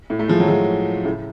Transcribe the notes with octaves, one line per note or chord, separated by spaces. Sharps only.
A2
A3
F3 G#3
F#3
F3 G#3
A2 C#3